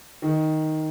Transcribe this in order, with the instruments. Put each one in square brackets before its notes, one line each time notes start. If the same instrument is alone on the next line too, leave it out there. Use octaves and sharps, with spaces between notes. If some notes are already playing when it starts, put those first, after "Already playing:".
[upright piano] D#3